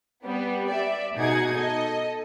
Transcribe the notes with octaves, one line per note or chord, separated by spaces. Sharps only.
G3 B3
D5 E5
B2 D#4 G#4 F#5 G#6
A4 D#5